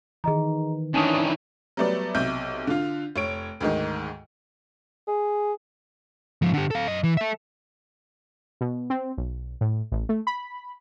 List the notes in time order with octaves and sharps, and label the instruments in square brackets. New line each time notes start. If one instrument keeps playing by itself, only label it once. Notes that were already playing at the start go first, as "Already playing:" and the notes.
[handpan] D#3 E3 [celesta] G#4 D#5 A#5
[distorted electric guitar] D#3 E3 [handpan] C#4 D4 [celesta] G#5 A5 D#6
[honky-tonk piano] F#3 G3 A3 B3 D5
B1 C3 E5 G6
D3 F4
F1 C#5 D7
D2 G#2 D#3
[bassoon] G#4
[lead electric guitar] G#2 F3
D3 G4
A4 F5
F#2 D#5
E3
A4 E5
[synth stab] B2
C4
B1
A2
A1
A3
B5